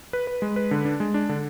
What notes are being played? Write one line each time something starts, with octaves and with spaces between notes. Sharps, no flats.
B4
B4
G#3
B4
D3
D4
G#3
D4
D3